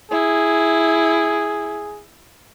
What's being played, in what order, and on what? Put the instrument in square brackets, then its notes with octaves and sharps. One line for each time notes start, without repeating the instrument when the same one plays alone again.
[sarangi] E4 [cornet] G#4